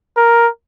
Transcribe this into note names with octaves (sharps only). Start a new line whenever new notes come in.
A#4